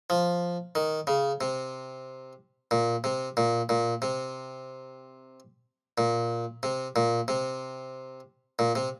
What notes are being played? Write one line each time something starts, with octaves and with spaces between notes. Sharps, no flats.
F3
D#3
C#3
C3
A#2
C3
A#2
A#2
C3
A#2
C3
A#2
C3
A#2
C3